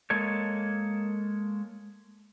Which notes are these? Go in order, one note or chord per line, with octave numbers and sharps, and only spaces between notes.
G#3 A#3 A4 C#5